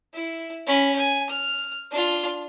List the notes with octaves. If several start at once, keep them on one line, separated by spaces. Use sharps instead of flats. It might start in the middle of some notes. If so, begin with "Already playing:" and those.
E4
C#4 B5
G#5
F6
D4 F4